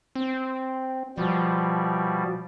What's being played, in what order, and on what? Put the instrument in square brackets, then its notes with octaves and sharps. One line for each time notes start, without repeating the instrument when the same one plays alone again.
[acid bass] C4
[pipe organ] B2 G3 [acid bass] F3